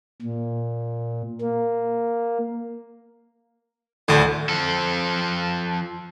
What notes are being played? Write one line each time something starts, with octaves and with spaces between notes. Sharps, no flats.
A#2
A#3
D2 A2 D3
F3 A4